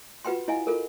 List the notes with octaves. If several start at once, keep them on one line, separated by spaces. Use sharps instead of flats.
F4 F#4 B4 F#5 G5 C6
E4 D#5 F5 G#5
F4 A4 A#4